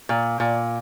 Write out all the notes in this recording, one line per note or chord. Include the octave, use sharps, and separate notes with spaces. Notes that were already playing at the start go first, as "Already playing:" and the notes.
A#2
A#2